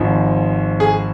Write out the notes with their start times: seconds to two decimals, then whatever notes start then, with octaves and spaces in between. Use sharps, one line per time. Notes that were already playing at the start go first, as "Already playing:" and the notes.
Already playing: G#1 G#2 F3
0.80 G#4